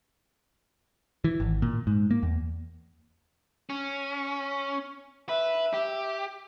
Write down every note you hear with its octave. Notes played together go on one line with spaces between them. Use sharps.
E3
G#1
A#2
G#2
A#3
E2
C#4
B4 E5
G4